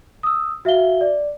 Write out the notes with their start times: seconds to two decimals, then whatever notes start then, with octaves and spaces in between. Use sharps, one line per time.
0.23 D#6 E6
0.65 F#4 E5 F5 G7
1.01 D5